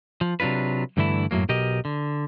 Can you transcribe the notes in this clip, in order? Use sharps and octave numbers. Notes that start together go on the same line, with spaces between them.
F3
C3 F#3 D4 F4 B4
G2 D3 E3 A3 E4
F#2 A2 F#3 A#3
B1 B2 G4 A#4 D#5
D3